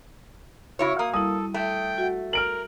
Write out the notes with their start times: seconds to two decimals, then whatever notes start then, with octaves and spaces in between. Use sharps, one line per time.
0.79 C#3 E4 F#4 C#5 B5
0.99 A#3 D#6
1.14 G3 E4 A4 D#6
1.54 A3 G5
1.98 F#4 E5 F#5
2.33 A#4 F6 D7 F#7